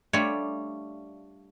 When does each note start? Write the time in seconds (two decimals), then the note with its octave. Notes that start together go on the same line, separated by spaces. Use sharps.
0.13 G3 A3 D4 F4 C#5